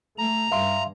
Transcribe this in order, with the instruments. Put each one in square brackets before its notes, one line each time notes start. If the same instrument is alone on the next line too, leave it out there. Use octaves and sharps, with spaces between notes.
[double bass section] A3 [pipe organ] A#5
[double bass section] G2 [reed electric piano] E5 F5 C6